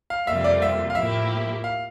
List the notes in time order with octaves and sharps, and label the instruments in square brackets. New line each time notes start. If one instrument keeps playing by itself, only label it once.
[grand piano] F5
[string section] F2 C3 G3 A#3 F4 [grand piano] E5
[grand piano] D5
E5
F5
[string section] A2 F3 A#3 E4 G4 [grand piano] E5
[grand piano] F5